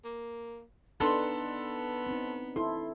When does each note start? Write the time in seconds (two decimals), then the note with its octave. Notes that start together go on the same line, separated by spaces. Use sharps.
0.04 A#3
1.00 B3 D4 D#4 A4 B4 C6
2.07 C4 D#4
2.56 E4 A4 C6